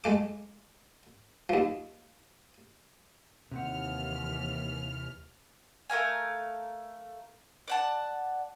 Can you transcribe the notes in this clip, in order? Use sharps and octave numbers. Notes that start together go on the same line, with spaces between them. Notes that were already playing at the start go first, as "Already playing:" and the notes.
G#3 A3 D6
D#2 F3
D#2 C3 E3 C4 F#5 F6
A3 A#4 F5 G#5
D5 F#5 A5